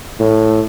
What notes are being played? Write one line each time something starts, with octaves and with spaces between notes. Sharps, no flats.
A2